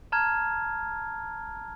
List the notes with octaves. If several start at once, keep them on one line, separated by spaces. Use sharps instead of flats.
A5 A#5 F6 G#6